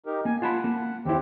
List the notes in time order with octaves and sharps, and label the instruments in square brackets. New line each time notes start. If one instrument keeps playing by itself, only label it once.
[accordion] D#4 G4 A#4
[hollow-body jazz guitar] A#3 [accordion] G#5
[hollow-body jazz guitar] F4 A5 B5 [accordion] F#5
[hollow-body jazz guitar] A#3
[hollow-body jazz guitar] D#2 E4 [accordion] C4 G4